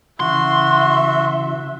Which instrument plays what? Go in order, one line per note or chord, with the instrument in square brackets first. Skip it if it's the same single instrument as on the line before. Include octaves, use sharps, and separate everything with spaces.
[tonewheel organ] C#3 E3 [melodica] F#4 [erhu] E5 [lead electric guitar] C6